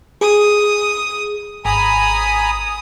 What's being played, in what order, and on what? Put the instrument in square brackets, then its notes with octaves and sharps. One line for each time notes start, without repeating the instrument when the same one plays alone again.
[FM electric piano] G#4 [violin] D#6
[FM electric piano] G#1 [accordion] G#5 A#5 B5 [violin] D#6